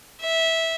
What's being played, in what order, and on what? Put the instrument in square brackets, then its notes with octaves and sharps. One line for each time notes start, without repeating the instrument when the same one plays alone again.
[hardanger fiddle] E5